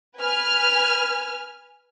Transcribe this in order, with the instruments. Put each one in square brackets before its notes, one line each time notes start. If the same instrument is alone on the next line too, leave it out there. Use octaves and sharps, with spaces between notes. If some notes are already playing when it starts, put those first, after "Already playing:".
[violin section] B4 G#5 F6